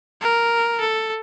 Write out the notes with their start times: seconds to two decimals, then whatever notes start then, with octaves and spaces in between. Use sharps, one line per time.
0.21 A#4
0.80 A4